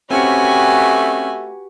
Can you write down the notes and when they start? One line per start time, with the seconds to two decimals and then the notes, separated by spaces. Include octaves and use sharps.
0.11 A3 C4 C#4 F#4 G4 B4 G#5 C#7